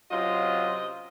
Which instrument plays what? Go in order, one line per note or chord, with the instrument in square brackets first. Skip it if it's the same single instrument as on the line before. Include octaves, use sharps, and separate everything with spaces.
[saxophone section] C3 C4 D#5 [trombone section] F#3 C#4 F4